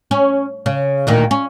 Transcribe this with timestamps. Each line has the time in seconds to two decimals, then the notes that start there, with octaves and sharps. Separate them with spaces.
0.11 C#4
0.66 C#3
1.07 D2 A#2 D#3
1.31 C#4